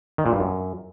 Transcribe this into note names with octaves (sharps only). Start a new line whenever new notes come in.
D#3
A#2
G2
F#2